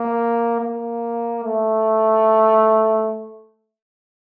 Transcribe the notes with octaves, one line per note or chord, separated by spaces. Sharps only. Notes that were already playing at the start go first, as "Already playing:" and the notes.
Already playing: A#3
A#3
A3